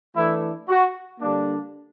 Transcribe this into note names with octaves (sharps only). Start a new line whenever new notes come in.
E3 A3 D4 E4
F#4
D3 G3 A#3 D4